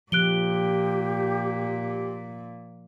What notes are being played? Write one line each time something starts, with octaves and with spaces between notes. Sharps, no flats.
A#2 F3 G4 F#6 D7 G7